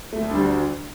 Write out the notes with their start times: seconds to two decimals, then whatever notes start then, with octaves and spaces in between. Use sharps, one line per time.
0.13 D2 A3
0.31 G3 D4